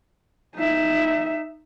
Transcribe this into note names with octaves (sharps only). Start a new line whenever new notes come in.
D#4 E5